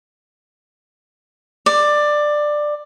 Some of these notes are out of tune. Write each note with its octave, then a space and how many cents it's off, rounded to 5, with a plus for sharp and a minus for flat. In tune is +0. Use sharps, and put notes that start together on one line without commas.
D5 +15